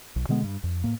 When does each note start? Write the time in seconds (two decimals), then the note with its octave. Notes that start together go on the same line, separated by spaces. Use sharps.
0.16 B1
0.29 B2 D3 G#3 B3
0.44 G2
0.63 F2
0.84 A2 A#3